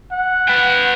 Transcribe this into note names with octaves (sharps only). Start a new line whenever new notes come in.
F#5
B4 G5